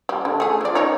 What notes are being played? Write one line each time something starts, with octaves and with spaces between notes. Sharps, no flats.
G3
D3
A3 G#4
F3 D5
D#4 C#5